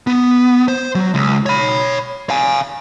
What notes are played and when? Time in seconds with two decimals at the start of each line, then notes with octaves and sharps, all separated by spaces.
0.07 B3
0.68 C5
0.95 F#3
1.14 C#2
1.46 C#5 B5
2.30 F5 G#5